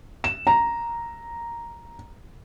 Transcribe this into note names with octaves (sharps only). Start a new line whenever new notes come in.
E7
A#5